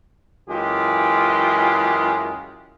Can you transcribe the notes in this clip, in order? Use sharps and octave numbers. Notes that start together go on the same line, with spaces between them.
F#2 E3 G#3 F4 G4